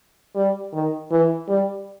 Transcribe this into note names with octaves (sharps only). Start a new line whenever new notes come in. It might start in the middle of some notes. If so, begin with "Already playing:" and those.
G3
D#3
E3
G3